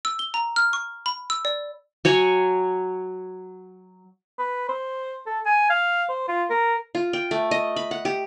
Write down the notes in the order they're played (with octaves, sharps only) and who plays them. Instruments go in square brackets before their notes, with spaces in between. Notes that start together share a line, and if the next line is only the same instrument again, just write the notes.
[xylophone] E6
G7
A#5
F6
C#6
B5
E6
D5
[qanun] F#3 C#5 G#5
[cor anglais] B4
C5
A4
G#5
F5
C5
F4
A#4
[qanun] F4
G5
A3
D#5
B5
F#5
G4